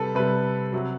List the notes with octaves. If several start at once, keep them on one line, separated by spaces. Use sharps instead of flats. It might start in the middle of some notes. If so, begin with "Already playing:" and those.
Already playing: C3 G3 A4 B4
C3 G3 B4
C3 F#3